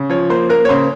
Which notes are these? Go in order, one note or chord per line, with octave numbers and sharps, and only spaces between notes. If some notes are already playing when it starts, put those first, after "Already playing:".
Already playing: C#3
F3 C#5
A#3 C5
A#3 A#4
C#5
C#3 C5